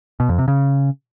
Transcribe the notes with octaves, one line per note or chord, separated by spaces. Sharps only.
B2
F2
C3
C#3